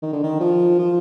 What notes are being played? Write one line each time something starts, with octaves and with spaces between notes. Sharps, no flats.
D#3
D3
D#3
F3
F3